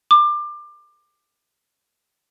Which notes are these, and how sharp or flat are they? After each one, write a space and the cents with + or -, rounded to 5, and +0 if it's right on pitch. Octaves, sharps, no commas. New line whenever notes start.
D6 +25